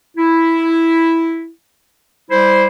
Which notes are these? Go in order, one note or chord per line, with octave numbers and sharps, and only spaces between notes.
E4
G3 E4 C5